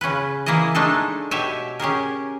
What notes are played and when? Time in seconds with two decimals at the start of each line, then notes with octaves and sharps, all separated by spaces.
0.01 C#3 C#4 F4 B4
0.46 E3 A#3 E4 G#4 D#5
0.75 G#3 A3 D4 D#4 F4 A4
1.31 B2 G4 C#5 E5 G#5
1.79 C#4 G4 G#4 A#4